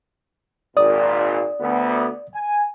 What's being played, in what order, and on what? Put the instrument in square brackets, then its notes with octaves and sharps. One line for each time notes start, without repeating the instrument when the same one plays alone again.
[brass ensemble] G#1 A#2 [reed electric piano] D5 D#6
[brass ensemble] D2 B3
G#5